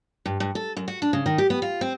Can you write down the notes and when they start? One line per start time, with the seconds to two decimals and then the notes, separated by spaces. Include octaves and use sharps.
0.26 G2
0.40 G2
0.55 A4
0.77 F#2
0.88 F#4
1.02 D4
1.13 C#3
1.26 D#3
1.38 G4
1.50 B3
1.62 F4
1.81 C4